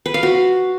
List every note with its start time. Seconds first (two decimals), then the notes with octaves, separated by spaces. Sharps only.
0.06 B4
0.14 F5
0.23 F#4